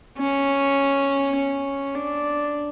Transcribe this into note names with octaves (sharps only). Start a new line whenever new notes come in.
C#4
C#4
D4